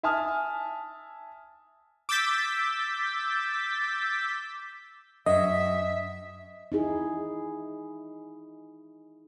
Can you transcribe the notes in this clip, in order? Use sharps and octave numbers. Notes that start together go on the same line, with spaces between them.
E5 G#5 A5 D#6 F6
D6 E6 G6 A6 B6
F#2 D#5 E5
D#4 E4 G#4